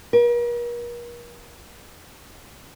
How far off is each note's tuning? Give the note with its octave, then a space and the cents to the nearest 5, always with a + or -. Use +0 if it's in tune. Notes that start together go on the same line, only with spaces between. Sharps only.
A#4 +40